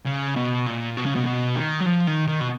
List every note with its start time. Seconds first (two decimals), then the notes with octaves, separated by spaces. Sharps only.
0.06 C#3
0.36 B2
0.66 A#2
0.97 B2
1.06 C#3
1.16 B2
1.26 B2
1.56 D#3
1.80 F#3
1.86 F3
2.07 D#3
2.28 D#3
2.40 B2